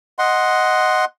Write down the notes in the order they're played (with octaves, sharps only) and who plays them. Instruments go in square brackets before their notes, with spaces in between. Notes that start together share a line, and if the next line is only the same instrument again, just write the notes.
[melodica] D#5 F#5 C6